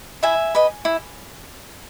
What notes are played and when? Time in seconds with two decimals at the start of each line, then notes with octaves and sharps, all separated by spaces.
0.23 E4 E5 G#5
0.55 B4 D#5
0.85 E4